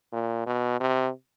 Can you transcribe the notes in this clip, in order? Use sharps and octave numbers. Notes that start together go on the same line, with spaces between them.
A#2
B2
C3